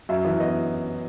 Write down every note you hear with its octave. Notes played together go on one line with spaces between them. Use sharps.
F#2 E5
E3
B3 D#5